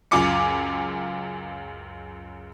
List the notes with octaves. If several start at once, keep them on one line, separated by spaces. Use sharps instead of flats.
C#2 F#2 F4 G#5 D6 C#7